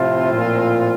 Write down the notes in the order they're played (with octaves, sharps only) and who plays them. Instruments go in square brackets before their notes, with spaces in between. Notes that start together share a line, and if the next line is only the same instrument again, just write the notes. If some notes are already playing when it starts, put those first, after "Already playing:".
Already playing: [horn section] A2 F3 C4 F4 [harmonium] C3
[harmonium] A#2